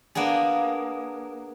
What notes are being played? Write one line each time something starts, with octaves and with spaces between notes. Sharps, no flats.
A#3 B3 D4 G#4